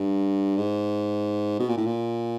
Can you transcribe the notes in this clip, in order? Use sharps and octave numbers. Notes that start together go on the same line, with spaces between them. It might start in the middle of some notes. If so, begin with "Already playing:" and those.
Already playing: G2
G#2
B2
A#2
A2
A#2